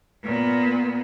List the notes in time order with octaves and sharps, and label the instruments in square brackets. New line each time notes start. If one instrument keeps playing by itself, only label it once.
[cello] A#2 B3